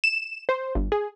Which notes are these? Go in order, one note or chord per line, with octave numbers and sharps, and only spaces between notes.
E7
C5
G1
G#4